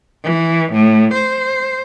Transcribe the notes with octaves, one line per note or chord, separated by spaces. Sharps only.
E3
A2
C5